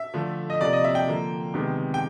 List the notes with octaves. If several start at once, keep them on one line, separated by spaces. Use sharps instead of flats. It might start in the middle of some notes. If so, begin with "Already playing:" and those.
Already playing: E5
D3 F3 A3
D#5
C3 F3 A#3 D5
D#5
E5
G5
D3 F3 A#3
C3 D#3 G#3 B3
G5